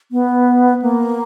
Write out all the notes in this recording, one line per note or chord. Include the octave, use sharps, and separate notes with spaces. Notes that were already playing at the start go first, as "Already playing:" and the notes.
B3
A#3